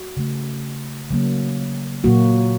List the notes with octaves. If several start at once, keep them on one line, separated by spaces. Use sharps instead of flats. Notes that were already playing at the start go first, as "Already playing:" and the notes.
Already playing: F#4
C#3 A3
C#3 F#3 A#3
A#2 F#3 A#3 F#4